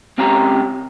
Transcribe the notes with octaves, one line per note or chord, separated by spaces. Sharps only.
C#2 C4 C#4 G4 G5 A#5